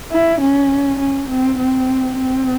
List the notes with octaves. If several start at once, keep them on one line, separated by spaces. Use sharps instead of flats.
E4
C#4
C#4
C4
C4
C4